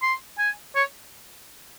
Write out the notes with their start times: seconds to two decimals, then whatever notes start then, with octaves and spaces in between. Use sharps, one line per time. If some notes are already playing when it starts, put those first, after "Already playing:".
0.02 C6
0.38 G#5
0.75 C#5